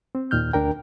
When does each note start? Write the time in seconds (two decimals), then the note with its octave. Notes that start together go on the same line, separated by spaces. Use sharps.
0.15 C4
0.31 D#2 A#2 D#3 F6 G6
0.53 D2 D4 A#4 G5